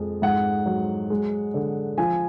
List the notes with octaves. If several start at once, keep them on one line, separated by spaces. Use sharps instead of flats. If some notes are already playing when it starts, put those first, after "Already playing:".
Already playing: F2 G#3
G#2 F#5
F#3
G#3
D3
F3 G#5